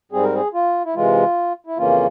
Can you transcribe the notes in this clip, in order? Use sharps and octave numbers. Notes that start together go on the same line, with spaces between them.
G#2 G3 C4 G#4
A#4
G#4
F4
E4
C3 E3 G#3 F4
E4
F2 C#3 E3 A#3 C#4 F4